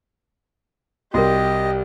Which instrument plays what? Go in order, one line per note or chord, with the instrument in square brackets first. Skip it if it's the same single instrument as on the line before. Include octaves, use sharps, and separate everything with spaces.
[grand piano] C2 [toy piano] F#4 A#4 [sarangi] G4 [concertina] D#5